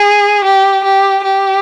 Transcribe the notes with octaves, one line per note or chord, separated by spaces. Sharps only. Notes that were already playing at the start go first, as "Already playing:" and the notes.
Already playing: G#4
G4
G4
G4